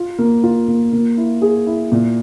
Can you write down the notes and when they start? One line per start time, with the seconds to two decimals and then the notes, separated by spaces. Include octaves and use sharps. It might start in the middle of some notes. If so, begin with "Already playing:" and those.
Already playing: F4
0.19 A#3
0.44 F4
0.68 A#3
0.93 A#3
1.17 E4
1.42 G#4
1.67 E4
1.92 A#2